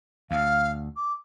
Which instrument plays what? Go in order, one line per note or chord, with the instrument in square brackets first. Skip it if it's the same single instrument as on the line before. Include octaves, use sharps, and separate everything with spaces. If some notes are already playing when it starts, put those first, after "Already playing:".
[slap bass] D2 [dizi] F5
[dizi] D6